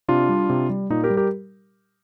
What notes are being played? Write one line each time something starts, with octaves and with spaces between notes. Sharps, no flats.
C3 D4 F4
G3
C3
G3
A#2 D#4
G4 A#4
G3
G4 A#4